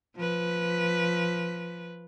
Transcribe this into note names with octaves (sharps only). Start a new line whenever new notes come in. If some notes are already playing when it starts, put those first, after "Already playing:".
F3 B4